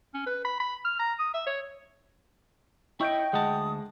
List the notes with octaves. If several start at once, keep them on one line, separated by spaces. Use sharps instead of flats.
C#4
B4
B5
B5
F6
A#5
D#6
E5
C#5
E4 C#5 D#5 G5 C#6 G6 D7
D2 G#3 D#5 F#5 A5 D#6